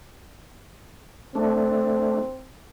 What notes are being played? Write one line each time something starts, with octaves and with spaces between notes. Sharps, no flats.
A3 C4 D4